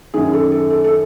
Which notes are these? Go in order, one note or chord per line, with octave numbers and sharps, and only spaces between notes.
F#2 D#3 G#4
A4
A4
A4
A4